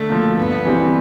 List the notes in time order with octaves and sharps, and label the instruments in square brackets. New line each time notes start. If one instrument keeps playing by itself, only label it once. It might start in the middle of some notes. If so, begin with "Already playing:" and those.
Already playing: [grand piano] D3 [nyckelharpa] A3
[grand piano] F3 A#3
[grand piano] G2 [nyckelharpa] B3
[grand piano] E3 G3 C4